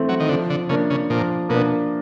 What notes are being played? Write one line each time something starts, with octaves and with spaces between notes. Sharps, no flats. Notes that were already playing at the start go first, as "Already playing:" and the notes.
Already playing: E3 A3 C4
F#3
D#3
D3 F3
D3
C#3 A#3 D4
C#3
A#2 F3
B2 A#3 D4